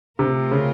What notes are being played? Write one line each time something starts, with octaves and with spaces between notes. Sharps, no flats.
C3 A3 C4 F4 A#4
C#3